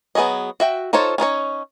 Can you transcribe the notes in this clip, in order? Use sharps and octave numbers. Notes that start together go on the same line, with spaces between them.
F#3 B3 G#4 C#5 D#5
F#4 E5 G5
D#4 F4 A4 C5 C#5
C#4 D#4 F4 C#5